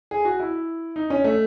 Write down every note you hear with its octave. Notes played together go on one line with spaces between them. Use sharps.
G#4
F#4
E4
D#4
C#4
A3